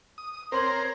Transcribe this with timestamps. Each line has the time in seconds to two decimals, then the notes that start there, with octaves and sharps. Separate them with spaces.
0.18 D#6
0.52 C4 A#4 C5 C#5 C6 F#7